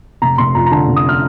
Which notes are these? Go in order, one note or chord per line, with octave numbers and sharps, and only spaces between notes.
F1 A#5
F1 C6
F2 A#5
A#5
D3 A5
F1
D#6
F6